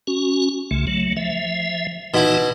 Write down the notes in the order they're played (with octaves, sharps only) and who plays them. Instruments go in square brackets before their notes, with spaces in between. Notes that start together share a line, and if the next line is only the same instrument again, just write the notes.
[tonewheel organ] C#4 F#4
C2 C#3 A3
F#3 A3
F3 E5
[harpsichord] B2 E4 [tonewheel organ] E3 D#4 F#4